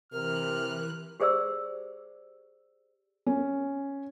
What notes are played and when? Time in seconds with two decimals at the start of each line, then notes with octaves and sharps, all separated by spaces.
0.12 C3 E3 A#4 F6 F#6
1.20 G4 G#4 C5 D5 E6
3.27 C#4